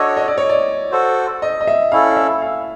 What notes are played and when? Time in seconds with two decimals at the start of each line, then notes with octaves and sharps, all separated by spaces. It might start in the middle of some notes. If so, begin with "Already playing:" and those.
Already playing: D4 F#4 A4 C#5 D#5
0.17 D#5
0.28 D5
0.38 C#5
0.50 D5
0.91 F#4 A4 C5
1.42 D#5
1.61 D#5
1.67 E5
1.92 C#4 E4 A4 F5
2.11 F5
2.17 E5
2.42 F5